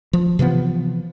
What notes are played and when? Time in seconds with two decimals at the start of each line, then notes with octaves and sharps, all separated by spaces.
0.13 F3
0.39 C3 E3 F3 B3